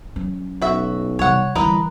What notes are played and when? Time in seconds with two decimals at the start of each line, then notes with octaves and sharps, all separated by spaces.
0.16 F#3 C#4
0.62 B1 F#4 E5
1.19 C3 G3 C#5 F#5
1.55 D3 E3 G3 A#4 B4 D#5